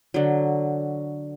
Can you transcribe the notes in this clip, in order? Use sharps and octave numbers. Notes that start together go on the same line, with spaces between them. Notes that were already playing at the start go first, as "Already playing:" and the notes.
D3 F#3